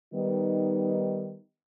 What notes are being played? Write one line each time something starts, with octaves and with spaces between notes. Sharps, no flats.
D#3 G3 B3 D#4